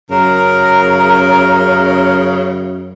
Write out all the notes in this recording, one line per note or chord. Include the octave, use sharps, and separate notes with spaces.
F#2 C#3 A#4 A#5